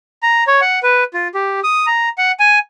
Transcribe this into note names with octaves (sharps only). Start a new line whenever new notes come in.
A#5
C#5
F#5
B4
F4
G4
D#6
A#5
F#5
G#5